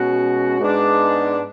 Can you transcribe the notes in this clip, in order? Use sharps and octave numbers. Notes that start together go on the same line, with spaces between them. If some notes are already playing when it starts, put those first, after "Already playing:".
Already playing: B2 G#3 C#4 F#4
G#2 G#3 B3 D4